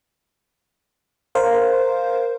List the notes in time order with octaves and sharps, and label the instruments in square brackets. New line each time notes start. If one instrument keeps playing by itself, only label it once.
[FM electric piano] A#4 C5 F5